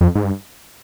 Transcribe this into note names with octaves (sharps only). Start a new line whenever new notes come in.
F2
G#2
G2